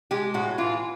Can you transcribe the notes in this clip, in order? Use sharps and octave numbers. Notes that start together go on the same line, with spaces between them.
G#3 G4
A2 F#4
E3 F4